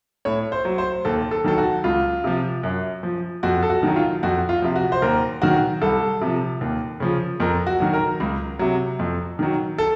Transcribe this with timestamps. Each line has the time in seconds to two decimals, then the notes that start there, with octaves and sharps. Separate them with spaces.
0.25 A2 C#5
0.52 C5
0.65 F#3
0.78 C5
1.05 D#2 A4
1.31 A4
1.44 D#3 F#3 A4
1.58 F#4
1.84 C#2 F4
2.24 C3 F3
2.63 F#2
3.03 F3
3.43 F2 F#4
3.63 A4
3.70 F#4
3.83 D#3 F#3
3.96 F4
4.23 F2 F#4
4.49 F4
4.62 C3 F3
4.76 F#4
4.92 C5
5.02 D#2 A#4
5.42 D#3 F#3 F#4
5.82 C2 A4
6.21 C3 F3
6.61 D#2
7.00 C#3 F3
7.40 F2 A#4
7.67 F#4
7.80 D#3 F#3
7.93 A#4
8.20 C#2
8.59 C3 F#3
8.99 F2
9.39 D#3 F#3
9.78 A4